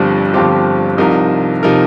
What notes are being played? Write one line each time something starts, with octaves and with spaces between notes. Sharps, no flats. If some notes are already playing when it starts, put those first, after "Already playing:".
Already playing: G1 G2 F3 C4 G4
G1 G2 F3 C4 G4
C2 C3 F3 D#4 A#4
C3 F3 D#4 A#4